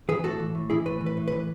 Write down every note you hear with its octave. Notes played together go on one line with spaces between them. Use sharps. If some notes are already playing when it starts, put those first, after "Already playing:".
E3 G#4 B4
A2 F#4 A4
E3
A2
E3 E4 G#4
A2 B4
E3
B4
A2
E3 B4